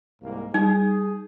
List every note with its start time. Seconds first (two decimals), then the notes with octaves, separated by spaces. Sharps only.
0.23 C2 G#2 A#3
0.54 G3 D#4 G#4